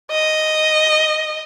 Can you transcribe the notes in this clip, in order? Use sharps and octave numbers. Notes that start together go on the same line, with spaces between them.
D#5